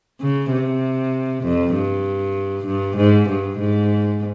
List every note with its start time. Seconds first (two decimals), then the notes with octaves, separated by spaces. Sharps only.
0.21 C#3
0.52 C3
1.44 F2
1.74 G2
2.66 G2
2.97 G#2
3.29 G2
3.59 G#2